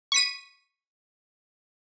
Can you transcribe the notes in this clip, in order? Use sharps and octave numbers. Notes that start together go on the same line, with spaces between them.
C#6 B6 D#7